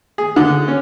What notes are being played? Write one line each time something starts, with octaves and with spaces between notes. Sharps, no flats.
G#4
D3
C#4